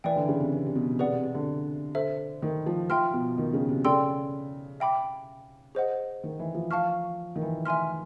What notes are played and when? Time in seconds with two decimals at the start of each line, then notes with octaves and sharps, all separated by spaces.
0.04 E3 B4 D5 G5
0.16 D3
0.28 C#3
0.40 C3
0.52 C3
0.66 C3
0.75 B2
0.99 C3 G#4 B4 D5 F#5
1.12 C3
1.23 C3
1.35 D3
1.95 A4 C5 E5
2.42 D#3
2.66 F3
2.89 F3 E5 G5 C6 F6
3.13 B2
3.38 D#3
3.53 C#3
3.69 C3
3.85 C#3 A4 D5 G5 C6 E6
4.80 E5 G5 B5 D6
5.75 G#4 C5 D#5 F#5
6.23 D#3
6.39 E3
6.54 F3
6.71 F5 A5 C#6 F6
7.36 D#3
7.42 E3
7.65 E5 G#5 C6 F6